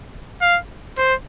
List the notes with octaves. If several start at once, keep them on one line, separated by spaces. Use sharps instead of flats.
F5
C5